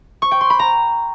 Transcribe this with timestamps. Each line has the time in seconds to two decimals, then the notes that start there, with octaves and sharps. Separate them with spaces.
0.22 C#6
0.31 G5
0.41 C6
0.50 B5
0.59 A#5